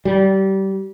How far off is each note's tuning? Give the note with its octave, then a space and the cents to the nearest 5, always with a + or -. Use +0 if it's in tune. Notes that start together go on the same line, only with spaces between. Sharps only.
G3 -25